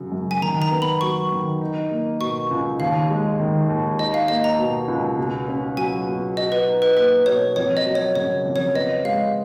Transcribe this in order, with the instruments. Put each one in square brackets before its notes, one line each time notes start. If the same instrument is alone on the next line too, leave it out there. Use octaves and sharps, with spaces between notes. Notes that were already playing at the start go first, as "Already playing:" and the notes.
Already playing: [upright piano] F#2 C#3 F#3
F#2
[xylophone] G#5
[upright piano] D#3 [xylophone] A#5
[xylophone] A#5
[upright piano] B3
[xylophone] B5
[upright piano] F#3 [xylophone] C#6
[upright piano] D#3
D#4
A#3
[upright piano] B2 [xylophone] C#6
[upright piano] C#2
[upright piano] D#2 [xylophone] F5
[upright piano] G#3
D#3
D#2
[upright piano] D#4 [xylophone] D#5
[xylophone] F5
[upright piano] A#3 [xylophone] D#5
[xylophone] A#5
[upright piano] B2
C#2
B2
C#4
[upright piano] F#3 [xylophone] G#5
[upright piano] B2
[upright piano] F#4 [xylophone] D#5
[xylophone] B4
[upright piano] D#4
[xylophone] B4
[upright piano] A#3 [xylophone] B4
[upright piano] B2 [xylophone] C#5
[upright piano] F2 [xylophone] C#5
[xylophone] D#5
[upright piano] F#3
[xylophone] C#5
[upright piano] C#3 [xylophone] C#5
[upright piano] F2
[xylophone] C#5
[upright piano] B3 [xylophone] D#5
[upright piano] G#3 [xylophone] F5